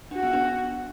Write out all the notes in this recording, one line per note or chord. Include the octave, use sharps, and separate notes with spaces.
D4 F#4
B3
D4